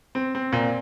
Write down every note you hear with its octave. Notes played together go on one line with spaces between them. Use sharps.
C4
C4
A#2